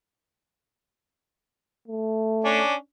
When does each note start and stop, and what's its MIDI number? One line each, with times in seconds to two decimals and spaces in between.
1.88 2.62 57
2.44 2.75 61
2.44 2.75 62